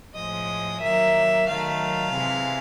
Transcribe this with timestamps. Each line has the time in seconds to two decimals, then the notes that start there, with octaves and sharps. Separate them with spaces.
0.15 A2 F3 G#3 D#5
0.82 D#3 F#3 A#3 E5
1.48 D#3 F#3 A3 F5
2.14 C3 E3 G#3